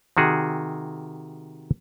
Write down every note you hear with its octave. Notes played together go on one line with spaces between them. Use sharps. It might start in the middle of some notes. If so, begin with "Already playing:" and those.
C3 D#3 F#4 G#4